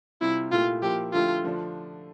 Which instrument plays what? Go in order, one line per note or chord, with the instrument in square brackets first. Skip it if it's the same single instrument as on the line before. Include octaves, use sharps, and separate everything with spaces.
[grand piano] C3 G3 C4 F4 [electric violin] E4
[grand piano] A#2 A3 E4 G4 [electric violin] F4
[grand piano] F3 A#3 E4 [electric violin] G4
[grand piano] D3 F3 A3 E4 G4 [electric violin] F4
[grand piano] D3 F3 A3 D4